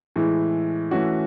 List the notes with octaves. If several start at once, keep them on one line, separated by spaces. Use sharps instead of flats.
A2 E3 G#3
E3 A3 C#4 F#4